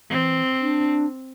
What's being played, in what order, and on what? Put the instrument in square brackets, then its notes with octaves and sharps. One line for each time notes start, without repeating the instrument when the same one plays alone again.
[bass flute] E3 [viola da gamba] C4
[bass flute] D4